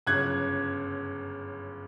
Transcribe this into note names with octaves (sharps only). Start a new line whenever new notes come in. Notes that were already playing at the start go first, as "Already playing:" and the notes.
G1 F#2 C#3 F#6 G#6